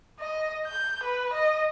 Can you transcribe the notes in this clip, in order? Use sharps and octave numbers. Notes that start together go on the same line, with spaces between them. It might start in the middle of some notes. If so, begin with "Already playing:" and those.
D#5
G6
B4
D#5